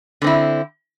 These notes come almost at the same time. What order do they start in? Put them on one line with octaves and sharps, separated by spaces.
D3 C4 E4